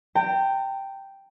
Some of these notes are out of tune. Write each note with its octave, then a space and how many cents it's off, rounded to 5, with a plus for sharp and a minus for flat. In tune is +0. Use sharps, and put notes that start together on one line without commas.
G5 +0 A#5 -45